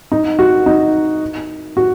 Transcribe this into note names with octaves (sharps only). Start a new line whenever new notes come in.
D#4
F#4
D#4
F#4